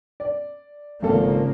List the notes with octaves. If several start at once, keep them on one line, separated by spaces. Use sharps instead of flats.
D5
G#1 C#3 F3 A#3 A4